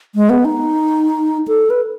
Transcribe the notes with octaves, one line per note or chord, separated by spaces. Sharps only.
G#3
B3
D#4
A4
B4